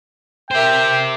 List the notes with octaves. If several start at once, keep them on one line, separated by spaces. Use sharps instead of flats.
G4 A#4 C5 E5 G5